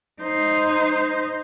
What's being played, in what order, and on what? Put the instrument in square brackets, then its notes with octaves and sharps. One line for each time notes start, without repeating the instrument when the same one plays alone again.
[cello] D#4 C5